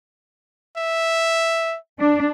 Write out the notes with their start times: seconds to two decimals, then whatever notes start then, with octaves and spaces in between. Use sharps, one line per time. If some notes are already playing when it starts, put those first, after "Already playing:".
0.77 E5
2.00 D4